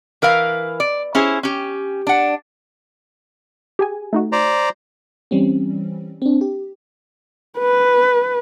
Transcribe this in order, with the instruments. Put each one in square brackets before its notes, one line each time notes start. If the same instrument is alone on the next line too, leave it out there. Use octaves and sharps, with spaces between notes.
[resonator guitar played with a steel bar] E3 A#4 B4 F5
D5
C#4 E4 G#4 C5
C#4 G4
D4 F#5
[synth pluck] G4 G#4 G#5
A3 D#4 F#4
[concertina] C5 D5 A#5
[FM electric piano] E3 G3 C4 C#4
C4 D4
G4
[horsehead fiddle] B4